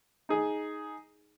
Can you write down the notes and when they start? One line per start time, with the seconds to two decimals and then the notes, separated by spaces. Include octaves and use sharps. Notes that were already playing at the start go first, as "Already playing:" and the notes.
0.29 D#4 G#4